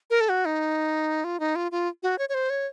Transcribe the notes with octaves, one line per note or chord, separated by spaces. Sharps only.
A#4
A4
F#4
D#4
F4
D#4
F4
F4
F#4
C#5
C#5
C5
C#5